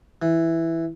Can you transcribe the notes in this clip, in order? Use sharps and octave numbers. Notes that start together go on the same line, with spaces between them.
E3